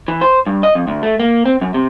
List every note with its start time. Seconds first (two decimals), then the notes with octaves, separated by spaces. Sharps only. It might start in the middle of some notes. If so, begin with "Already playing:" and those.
0.08 E3
0.21 C5
0.47 G2
0.63 D#5
0.75 F2
0.87 D2
1.03 A3
1.20 A#3
1.46 C4
1.61 F#2
1.74 C3